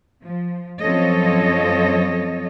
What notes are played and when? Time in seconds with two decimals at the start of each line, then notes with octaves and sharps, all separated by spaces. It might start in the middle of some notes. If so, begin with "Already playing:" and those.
0.23 F3
0.81 F#2 F3 C4 A4 C#5 D#5